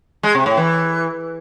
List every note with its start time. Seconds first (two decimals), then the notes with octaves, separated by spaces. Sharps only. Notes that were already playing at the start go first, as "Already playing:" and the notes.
0.23 G#3
0.35 C3
0.46 A2
0.57 E3